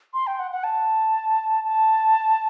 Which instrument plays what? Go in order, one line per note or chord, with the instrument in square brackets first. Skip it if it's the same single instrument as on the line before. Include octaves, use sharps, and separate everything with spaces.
[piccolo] C6
G5
F#5
F#5
A5
A5